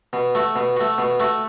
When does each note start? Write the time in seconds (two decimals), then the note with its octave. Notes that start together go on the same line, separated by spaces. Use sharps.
0.13 B2
0.35 A3 F#4
0.56 B2
0.77 A3 F#4
0.98 B2
1.20 A3 F#4